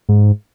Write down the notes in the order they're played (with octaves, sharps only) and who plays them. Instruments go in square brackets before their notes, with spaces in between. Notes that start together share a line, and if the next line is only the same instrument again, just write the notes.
[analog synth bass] G#2